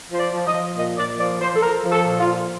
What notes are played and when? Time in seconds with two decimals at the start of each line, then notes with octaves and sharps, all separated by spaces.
0.11 F3 C5
0.19 D5
0.33 F3
0.47 D#5
0.54 F3
0.76 A#2 D#5
0.98 A#2 D5
1.19 F3 D5
1.41 F3 C5
1.56 A4
1.63 F3 A#4
1.85 F3
1.92 A4
2.05 A#2
2.20 F4
2.27 F3